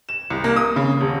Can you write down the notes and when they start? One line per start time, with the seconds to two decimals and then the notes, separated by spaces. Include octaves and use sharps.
0.09 E7
0.30 C2
0.44 A#3
0.56 D#6
0.76 C#3
1.01 D#1